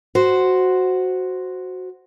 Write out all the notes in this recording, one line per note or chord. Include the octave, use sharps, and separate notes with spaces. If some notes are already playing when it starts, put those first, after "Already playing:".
F#4 C5